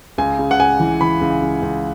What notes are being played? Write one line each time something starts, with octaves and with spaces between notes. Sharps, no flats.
C#2 G#5
C#3
F#5
C#2 G#5
E3
E3 B5
C#2
C#2
C#2